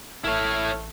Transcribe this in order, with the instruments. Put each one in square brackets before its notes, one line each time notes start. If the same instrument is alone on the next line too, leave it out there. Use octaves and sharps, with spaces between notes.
[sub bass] A1 [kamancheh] A3 F6 [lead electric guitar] E4 C#5